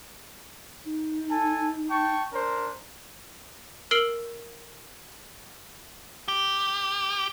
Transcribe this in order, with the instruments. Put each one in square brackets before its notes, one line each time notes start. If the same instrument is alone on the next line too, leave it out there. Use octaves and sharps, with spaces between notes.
[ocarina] D#4
[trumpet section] A4 G#5 A5
G5 A5 C#6
D4 A#4 C5
[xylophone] A#4 E6 F6 C7 D7 F#7
[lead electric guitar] G4